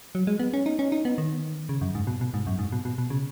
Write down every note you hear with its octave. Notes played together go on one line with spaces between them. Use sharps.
F#3
G#3
B3
C#4
D#4
C#4
D#4
B3
D#3
C#3
F#2
G#2
B2
B2
G#2
F#2
G#2
B2
B2
B2
C#3